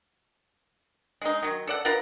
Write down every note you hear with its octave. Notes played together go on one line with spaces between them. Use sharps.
G#3 D#4
D#3 F#3
A4 D5 F#5
F4 A#4 B4 F#5